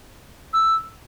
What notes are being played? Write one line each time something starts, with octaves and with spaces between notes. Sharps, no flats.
E6